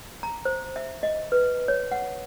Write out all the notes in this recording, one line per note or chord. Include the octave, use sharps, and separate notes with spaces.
A#5
C5
E5
D#5
B4
C#5
F#5